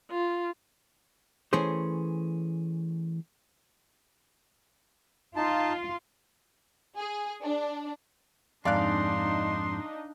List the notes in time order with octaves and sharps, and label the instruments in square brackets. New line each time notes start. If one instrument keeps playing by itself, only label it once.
[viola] F4
[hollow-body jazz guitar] E3 A3 C#4 G#4 C5
[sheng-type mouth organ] D#4 A5 [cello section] F4
[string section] G#4
D4
[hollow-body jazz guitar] F2 G#2 [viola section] D4 D#4 [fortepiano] D5 F5 F#6 [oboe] C6